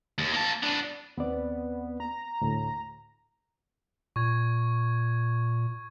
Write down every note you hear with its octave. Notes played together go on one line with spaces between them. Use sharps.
D#2
A#3 A5
B3 D4
D#2 B3 C4 D5
A#5
D2 A2
A#2 C#6 G#6